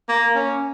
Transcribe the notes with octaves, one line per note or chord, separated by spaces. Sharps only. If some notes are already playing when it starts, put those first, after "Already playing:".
A#3
C#4